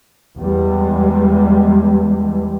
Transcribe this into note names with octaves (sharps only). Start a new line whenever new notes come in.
E2 G3 G#3